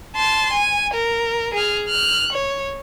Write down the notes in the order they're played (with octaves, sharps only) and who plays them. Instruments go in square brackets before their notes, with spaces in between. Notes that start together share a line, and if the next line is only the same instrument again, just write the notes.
[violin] A5 C6
G#5
A#4
G#4 F6
F6 F#6
C#5